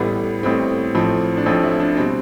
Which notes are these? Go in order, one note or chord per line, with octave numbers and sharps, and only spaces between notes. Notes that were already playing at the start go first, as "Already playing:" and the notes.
Already playing: A1 A2 G3 B3
A1 A2 G3 C4
A1 A2 F3 C4
D4
A1 A2 F3 C4
E4
D4
B2 G3 C4